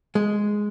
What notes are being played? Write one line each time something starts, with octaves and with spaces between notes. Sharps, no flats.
G#3